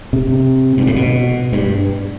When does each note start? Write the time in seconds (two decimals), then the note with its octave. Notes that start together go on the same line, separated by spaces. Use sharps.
0.13 C3
0.77 G2
0.87 A2
0.96 B2
1.52 G2